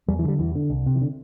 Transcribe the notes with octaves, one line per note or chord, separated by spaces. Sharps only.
E2 G3
E3
D3 G3
E2 E3
D3
C2
C3
E3
D3